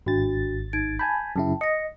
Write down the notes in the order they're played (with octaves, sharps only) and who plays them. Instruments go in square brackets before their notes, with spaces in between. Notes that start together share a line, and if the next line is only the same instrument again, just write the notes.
[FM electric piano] G#1 A6 [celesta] D4 F#4
[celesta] D#4 G#6 D7
[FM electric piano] G#5 A5 B5 [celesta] G6 G#6
[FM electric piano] F#2 C#3 E4 [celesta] G5 A5
[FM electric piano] D#5 [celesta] A#6 C#7